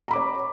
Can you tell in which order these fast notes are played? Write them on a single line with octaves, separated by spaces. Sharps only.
A#5 B5 D6 C#5